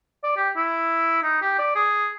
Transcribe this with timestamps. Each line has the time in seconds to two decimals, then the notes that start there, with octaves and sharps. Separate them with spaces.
0.24 D5
0.37 G4
0.56 E4
1.23 D#4
1.42 G4
1.59 D5
1.76 G#4